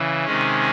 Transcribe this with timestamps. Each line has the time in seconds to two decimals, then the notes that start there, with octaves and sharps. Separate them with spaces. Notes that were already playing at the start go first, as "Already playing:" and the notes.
Already playing: C#3 E3
0.25 C3 D#3 G#3 C#4